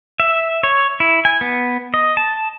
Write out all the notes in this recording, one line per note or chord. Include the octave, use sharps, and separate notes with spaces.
E5
C#5
E4
G#5
B3
D#5
A5